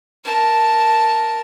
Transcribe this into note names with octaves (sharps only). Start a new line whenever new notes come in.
A#4 A5